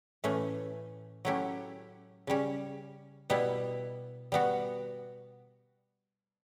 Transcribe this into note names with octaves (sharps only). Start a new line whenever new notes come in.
A2 E3 A3 C#4
F#3 A3 C#4 E4 G4
C#3 G3 C#4
B2 G3 B3 E4
G3 B3 F#4